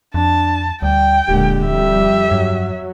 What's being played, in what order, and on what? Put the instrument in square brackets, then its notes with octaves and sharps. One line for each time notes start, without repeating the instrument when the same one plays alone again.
[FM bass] F2 [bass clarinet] D4 [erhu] A5
[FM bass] D2 [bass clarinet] G3 [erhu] G5
[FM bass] D1 [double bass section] A#2 D3 G#3 [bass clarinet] G4
[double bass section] F2 G3 [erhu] E5
[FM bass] G2 [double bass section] F#3